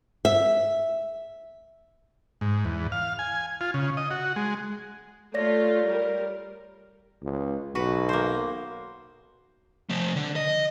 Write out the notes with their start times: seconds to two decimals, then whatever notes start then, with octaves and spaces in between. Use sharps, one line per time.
0.25 E5
2.41 G#2
2.65 E2
2.92 F5
3.19 G#5
3.61 F4
3.74 C#3
3.97 D#5
4.11 F#4
4.36 G#3
5.34 A3 F4 C#5 D5 A#6
5.87 G3 A#4
7.23 C#2
7.75 B1 F#4 B4
8.09 A#3 C5
9.89 F3 A3
10.16 D3
10.36 D#5